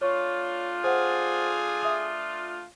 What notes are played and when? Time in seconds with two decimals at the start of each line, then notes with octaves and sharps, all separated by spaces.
0.01 A3 D4 F4 C#5 C#6
0.84 G#4 C5 F#5
1.82 E5 D#6